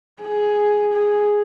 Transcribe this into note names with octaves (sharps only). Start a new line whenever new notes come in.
G#4
G#4